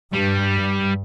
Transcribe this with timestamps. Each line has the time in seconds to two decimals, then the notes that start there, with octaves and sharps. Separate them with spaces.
0.13 G2 G3
0.54 G2